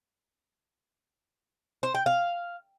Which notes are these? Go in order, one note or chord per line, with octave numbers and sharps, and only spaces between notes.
C5
G5
F5